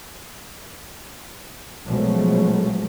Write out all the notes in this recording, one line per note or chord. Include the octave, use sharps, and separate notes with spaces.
B2 F3 F#3 G#3 A3 C#4